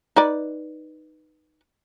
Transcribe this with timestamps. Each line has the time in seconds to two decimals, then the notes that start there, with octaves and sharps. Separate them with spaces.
0.16 D#4 B4 D5